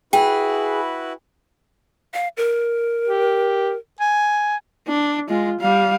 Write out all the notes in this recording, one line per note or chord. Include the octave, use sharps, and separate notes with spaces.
E4 F#4 G#4 B4 G5
F5
A#4
G4
G#5
D4
G#3 F4
G3 F5